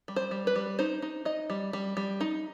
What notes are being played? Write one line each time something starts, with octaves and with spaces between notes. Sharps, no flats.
G3
C5
G3
B4
G3
D#4 C5
D#4
D#4 D#5
G3
G3
G3
D#4